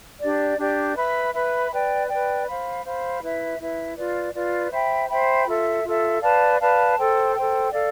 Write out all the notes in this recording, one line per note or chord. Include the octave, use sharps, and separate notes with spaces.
D4 G4 D5
D4 G4 D5
B4 E5 B5
B4 E5 B5
B4 D5 G5
B4 D5 G5
C5 F5 B5
C5 F5 B5
E4 B4 E5
E4 B4 E5
F4 B4 D5
F4 B4 D5
C5 E5 G5 B5
C5 E5 G5 B5
F4 A4 E5
F4 A4 E5
B4 D5 F5 A5
B4 D5 F5 A5
A4 C5 G5
A4 C5 G5
A4 D5 F5